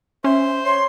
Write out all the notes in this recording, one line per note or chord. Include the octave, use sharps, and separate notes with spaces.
C#4 C5 E5
C#5 C6